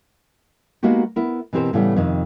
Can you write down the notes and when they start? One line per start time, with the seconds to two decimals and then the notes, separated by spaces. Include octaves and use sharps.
0.83 G#3 A#3 B3 D#4 F#4 G4
1.16 B3 E4 A#4
1.53 B2 E3 C4 G4 A#4 C5
1.73 A2 C#3 E3 G3 A3 B3
1.96 F2 C3 D#3